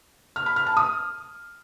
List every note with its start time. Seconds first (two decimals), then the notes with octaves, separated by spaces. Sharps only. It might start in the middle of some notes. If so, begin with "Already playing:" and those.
0.36 F6
0.46 B5
0.56 F6
0.66 A5
0.77 D#6